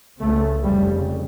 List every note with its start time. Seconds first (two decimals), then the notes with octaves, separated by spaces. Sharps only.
0.20 C#2 C#3 A3
0.63 F1 F2 C#3 G3